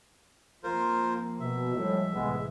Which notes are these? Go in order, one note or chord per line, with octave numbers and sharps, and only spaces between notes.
F3 A#3 C4 F4 A#4 C5
B2 E5
A2 F3 G3 G#3
C2 A2 E3 G#3 B3